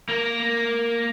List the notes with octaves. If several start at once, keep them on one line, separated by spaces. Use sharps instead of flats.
A#3 A#4